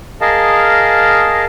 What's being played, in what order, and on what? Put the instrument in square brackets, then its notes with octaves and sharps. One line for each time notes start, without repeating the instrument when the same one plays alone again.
[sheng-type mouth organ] G#4 A#4 D#5 F5 A5